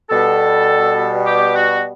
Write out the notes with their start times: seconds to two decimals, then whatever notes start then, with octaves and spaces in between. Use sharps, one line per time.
0.10 B2 G3 B3 A4
1.26 G4
1.55 F#4